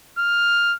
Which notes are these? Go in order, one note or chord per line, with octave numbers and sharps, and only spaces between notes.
F6